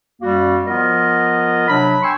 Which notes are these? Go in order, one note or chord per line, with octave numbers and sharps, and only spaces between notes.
F#2 G3 A#3 F#4
F3 B3 F4 A#4 D#5
C3 F#3 D4 B5
G5 G#5 C6 C#6 E6